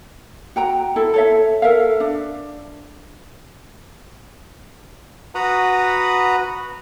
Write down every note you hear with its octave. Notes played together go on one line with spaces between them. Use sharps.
F#4 G5 A#5
E4 A4
A4 C#5 E5
A4 A#4 E5 F5
D4
F#4 B4 F#5 A#5 B5 D#6